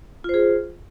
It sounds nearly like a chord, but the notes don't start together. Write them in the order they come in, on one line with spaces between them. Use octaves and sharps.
F4 C5 G#4